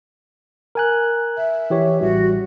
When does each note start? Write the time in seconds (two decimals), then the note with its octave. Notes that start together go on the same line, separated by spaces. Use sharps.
0.75 A#4 G#5 F#6
1.37 E5
1.70 E3 G4 C#5
2.01 A1 G3 F#4